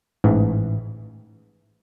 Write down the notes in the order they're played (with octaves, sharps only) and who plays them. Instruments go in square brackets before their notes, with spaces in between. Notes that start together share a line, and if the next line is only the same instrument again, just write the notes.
[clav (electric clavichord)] A1 G#2 E3